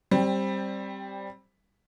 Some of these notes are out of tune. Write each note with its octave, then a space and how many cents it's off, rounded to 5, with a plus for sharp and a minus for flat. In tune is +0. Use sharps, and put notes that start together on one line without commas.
G3 +0 C4 +15